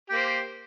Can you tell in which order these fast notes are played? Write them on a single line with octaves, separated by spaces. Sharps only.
G4 A#3 C5